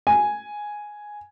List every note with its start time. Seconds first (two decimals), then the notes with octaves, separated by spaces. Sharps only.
0.07 G#5